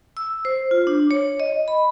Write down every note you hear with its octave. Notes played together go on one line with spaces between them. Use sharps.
E6
C5
F4
D4
C#5
D#5
B5